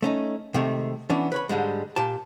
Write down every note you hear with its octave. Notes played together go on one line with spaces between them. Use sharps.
A3 C#4 D#4
C3 D#3 G#3 A3
E3 B3 C#4 D4
B4 C#5 B5
G#2 D3 G3 G#3
A#2 G4 A5